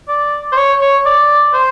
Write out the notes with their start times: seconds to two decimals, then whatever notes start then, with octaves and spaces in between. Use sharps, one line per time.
0.08 D5
0.52 C5
0.57 C#5
0.81 C#5
1.06 D5
1.54 C5